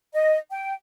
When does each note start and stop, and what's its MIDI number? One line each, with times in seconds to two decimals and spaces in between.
0.14 0.37 75
0.50 0.73 79